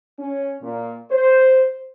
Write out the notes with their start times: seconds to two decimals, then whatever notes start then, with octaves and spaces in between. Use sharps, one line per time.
0.19 C#4
0.62 A#2
1.11 C5